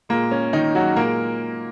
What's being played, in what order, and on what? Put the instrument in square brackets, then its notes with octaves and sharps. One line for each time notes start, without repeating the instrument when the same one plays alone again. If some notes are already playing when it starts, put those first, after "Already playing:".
[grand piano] A#2 G#3 A#3
C#4
D#3 D#4
F#3 F#4
A#2 G#3 A#3 A#4